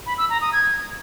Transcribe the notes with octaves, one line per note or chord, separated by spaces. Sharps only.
B5
E6
A#5
D#6
G#6